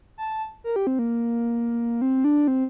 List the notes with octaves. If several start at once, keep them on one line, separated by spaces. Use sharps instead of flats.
A5
A#4
G4
C4
A#3
C4
D4
C4